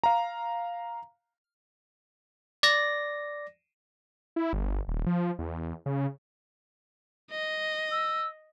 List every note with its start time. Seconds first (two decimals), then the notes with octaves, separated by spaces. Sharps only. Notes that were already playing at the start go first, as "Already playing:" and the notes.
0.04 F5 A#5
2.63 D5 A#6
4.36 E4
4.53 G1
4.88 D#1
5.07 F3
5.39 E2
5.86 C#3
7.31 D#5
7.91 E6